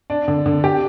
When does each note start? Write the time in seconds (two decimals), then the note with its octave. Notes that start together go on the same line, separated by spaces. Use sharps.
0.10 D4
0.28 D3
0.46 D3
0.64 G4